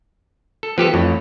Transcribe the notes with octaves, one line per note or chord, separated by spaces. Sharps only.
A4
F3 B3 G4 A4
F2 E3 A3 C#5